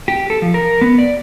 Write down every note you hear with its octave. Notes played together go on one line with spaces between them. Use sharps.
G4
A4
F3
A#4
B3
D5